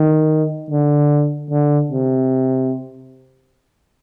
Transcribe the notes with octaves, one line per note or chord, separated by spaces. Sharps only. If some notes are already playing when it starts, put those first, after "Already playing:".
Already playing: D#3
D3
D3
C3